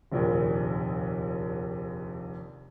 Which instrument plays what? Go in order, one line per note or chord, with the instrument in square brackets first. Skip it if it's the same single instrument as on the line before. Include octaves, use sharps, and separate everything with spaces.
[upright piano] F1 A#1 D#2